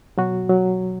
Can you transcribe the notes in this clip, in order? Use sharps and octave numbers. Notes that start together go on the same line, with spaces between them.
B2 F#3 F#4
F#3